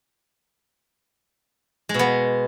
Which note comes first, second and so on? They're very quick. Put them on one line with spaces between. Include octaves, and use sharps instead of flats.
G#3 B2 B3